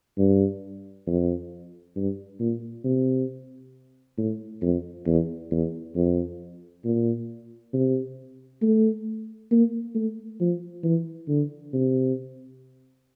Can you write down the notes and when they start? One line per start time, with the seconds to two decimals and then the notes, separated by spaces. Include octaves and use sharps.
0.18 G2
1.07 F2
1.96 G2
2.40 A#2
2.84 C3
4.18 A2
4.62 F2
5.07 E2
5.51 E2
5.95 F2
6.84 A#2
7.74 C3
8.62 A3
9.51 A#3
9.95 A3
10.40 F3
10.84 E3
11.29 D3
11.73 C3